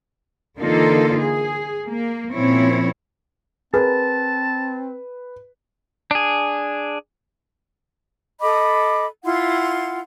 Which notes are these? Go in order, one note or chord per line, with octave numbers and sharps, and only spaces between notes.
D3 E3 A#3 D#4 F4 A4
G#4
A#3
A#2 F3 C4 C#4 E4 C#5
C4 G#4 A#4 B4 A5
D4 G#4
A4 D#5 B5 D6
E4 F4 F#5 C6